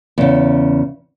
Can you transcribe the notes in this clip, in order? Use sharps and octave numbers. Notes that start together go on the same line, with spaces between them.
E2 C#3